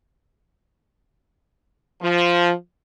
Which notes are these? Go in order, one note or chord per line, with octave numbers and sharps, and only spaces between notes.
F3